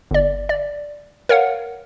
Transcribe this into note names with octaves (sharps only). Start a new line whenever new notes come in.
G1 D5
D5
A#4 C#5 F5 F#5